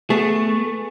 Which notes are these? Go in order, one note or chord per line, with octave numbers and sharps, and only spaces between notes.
A3 B3 G#4